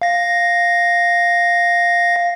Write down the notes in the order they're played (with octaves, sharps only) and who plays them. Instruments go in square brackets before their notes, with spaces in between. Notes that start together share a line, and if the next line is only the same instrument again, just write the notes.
[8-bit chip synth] F5 A#6